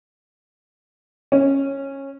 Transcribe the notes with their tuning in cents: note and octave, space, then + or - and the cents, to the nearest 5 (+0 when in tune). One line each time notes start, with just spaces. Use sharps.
C#4 -15